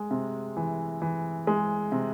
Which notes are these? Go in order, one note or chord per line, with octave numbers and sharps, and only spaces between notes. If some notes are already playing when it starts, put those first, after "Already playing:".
Already playing: G#3
C3
E3
E3
G#3
C3